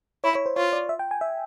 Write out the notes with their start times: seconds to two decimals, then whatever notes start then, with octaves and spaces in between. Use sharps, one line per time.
0.24 E4 C#5
0.35 C#5
0.46 C5
0.56 F4 C#5
0.73 D5
0.89 E5
0.99 G5
1.11 G#5
1.21 E5